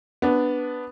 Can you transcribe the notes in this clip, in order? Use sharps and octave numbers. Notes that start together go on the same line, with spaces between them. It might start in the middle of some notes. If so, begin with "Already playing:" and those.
B3 D4